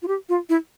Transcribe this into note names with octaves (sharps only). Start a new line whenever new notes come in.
F4
G4
F4
E4